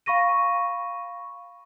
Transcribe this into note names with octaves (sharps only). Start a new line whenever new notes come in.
F5 B5 C#6 A#6 D#7